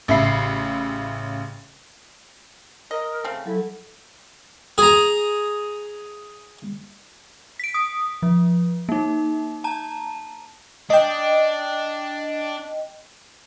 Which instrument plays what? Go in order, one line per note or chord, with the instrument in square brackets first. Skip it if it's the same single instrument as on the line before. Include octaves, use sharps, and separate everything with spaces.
[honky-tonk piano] A1 C#3 E5 B5 C7
[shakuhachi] A#4 [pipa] D#5
[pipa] C#3 A3 C4
[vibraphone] F#3 A4 [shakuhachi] E4
[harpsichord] G#4 A#5
[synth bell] B6 D7
D#6
F3
A#3 D#4
A5 A#5
[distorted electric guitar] D4 [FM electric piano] D#5 G5